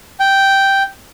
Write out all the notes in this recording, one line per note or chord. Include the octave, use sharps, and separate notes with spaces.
G5